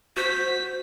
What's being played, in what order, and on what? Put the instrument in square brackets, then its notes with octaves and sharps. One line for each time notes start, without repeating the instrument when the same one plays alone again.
[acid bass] F#4 [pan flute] C5 [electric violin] B6